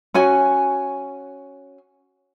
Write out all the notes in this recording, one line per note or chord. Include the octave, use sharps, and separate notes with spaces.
C#4 F#4 G#5